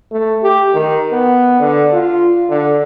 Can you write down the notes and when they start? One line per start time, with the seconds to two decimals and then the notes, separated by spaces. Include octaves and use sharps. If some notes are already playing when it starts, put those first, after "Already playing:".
0.11 A3
0.43 G4
0.74 D#3
1.12 B3
1.59 D3
1.93 F4
2.50 D3